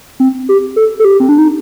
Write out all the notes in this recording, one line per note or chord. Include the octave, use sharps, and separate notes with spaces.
C4
G4
A4
A4
G4
C4
D4
D#4